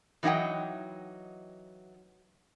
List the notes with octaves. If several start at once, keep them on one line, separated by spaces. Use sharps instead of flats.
E3 F#3 D#4 D#5 F#5 G5